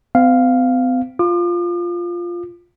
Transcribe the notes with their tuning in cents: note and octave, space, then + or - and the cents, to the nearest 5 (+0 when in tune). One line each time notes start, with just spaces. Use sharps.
C4 -45 F5 +0
F4 +0 D6 +45